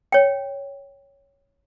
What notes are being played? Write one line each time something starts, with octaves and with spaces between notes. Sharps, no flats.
C#5 G5